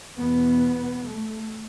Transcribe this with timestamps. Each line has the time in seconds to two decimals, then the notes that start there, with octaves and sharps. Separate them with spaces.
0.17 E2 B2 B3
1.07 A3